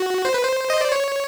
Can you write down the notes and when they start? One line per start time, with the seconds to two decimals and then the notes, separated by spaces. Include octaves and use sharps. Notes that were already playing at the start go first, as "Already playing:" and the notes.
Already playing: F#4
0.25 C5
0.34 B4
0.44 C5
0.70 D#5
0.81 D5
0.92 C#5